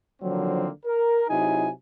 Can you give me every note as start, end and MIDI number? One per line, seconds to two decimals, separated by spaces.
0.22 0.68 50
0.22 0.68 51
0.22 0.68 53
0.22 0.68 54
0.22 0.68 58
0.22 0.68 60
0.86 1.25 70
1.29 1.69 48
1.29 1.69 54
1.29 1.69 63
1.29 1.69 64
1.29 1.69 68
1.29 1.69 80